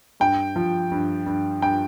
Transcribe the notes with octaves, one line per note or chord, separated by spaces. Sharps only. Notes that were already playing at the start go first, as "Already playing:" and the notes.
G2 G5
F3
G2
G2
G2 G5